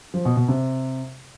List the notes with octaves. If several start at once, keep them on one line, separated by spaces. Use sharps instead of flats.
F3
B2
B2
C3